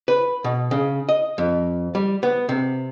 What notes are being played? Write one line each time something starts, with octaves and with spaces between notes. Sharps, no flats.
B4
B2
C#3
D#5
F2
G3
B3
C3